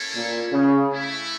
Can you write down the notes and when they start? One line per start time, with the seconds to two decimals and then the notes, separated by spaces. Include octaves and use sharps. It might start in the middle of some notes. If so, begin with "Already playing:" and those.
Already playing: A#3 C#4 E4 A4 C#5
0.15 A#2
0.52 C#3
0.90 A3 C#4 E4